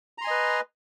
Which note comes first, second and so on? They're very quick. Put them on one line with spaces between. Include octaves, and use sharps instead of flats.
A#5 C6 G#5 D#5 B4